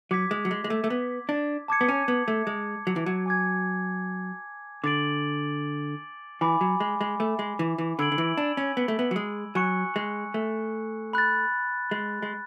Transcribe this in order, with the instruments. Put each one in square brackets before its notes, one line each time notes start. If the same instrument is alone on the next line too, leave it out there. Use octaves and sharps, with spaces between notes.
[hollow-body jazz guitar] F#3 [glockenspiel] D6 G#6 B6
[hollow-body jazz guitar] G#3
F#3
G#3
G#3
A3
A3
B3
D4
[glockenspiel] A5 D6 G#6 C#7
[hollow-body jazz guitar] B3
C#4
B3
A3
G#3
F#3
E3
F#3
[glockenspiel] G#5 D6 G#6
[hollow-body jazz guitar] D3 [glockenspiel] D6 A6 D7 F#7
[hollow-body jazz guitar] E3 [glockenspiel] G#5 B5 D6
[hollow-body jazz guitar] F#3
G#3
G#3
A3
G#3
E3
E3
[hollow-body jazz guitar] D3 [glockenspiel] B5 E6 G#6 D7 F#7
[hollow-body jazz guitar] D3
E3
D4
C#4
B3
A3
B3
F#3
G#3
[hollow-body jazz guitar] F#3 [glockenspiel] G#5 C#6 F#6 C#7
[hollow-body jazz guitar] G#3
A3
[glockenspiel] B5 F#6 A6
[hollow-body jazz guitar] G#3
G#3